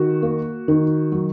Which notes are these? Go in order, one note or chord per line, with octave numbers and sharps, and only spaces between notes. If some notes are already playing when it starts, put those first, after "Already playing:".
Already playing: D#3 F#4
A#3
D#3
F#3